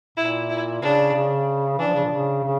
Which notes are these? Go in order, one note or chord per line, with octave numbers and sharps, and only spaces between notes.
A#2 E4
E4
C#3 D4
C#3
E3 D4
F3
C#3
A#2
C#3
C#3